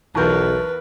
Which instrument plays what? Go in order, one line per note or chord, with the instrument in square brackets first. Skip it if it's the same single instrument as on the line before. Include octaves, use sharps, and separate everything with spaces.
[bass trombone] B1 [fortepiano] E2 F4 A#4 [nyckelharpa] B4 [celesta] A5 C#6 G6